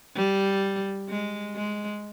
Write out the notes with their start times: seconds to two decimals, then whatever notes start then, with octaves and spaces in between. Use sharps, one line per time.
0.15 G3
1.09 G#3
1.56 G#3